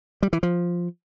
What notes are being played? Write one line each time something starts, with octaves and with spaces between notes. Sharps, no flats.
G3
E3
F3